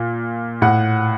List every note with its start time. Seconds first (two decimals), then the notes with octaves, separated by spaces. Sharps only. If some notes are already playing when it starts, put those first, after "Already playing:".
Already playing: A#2
0.62 A2 F#5